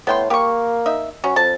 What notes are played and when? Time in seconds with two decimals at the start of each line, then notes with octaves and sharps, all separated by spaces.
0.07 A2 B3 G5 C6
0.30 A#3 G4 C#6
0.86 D#4 E5
1.24 F#3 C#4
1.36 F2 A5